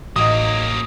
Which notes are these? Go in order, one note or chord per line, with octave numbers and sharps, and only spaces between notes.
A1 F#3 A#3 D#4 F#4 D#6